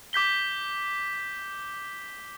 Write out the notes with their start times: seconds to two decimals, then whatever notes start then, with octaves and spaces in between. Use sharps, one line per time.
0.13 D6 G6 B6 G7